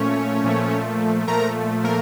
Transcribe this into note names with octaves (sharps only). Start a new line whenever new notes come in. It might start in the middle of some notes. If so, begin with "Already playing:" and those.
Already playing: A#2 F3 A3 C#4 C#5
A#2 F3 A3
A#2 F3 A3 A#4 A#5
A#3 A#4